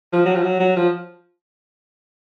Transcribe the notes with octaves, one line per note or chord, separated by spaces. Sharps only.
F3
F#3
F3
F#3
F#3
F3